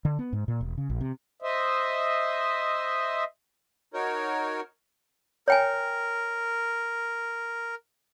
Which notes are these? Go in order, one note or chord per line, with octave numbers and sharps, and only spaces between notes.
D3
B3
G#2
A#2
E1
C#3
A#1
C3
C5 D#5 E5
D#4 F#4 A#4 C#5
A#4 C#5 G5 G#5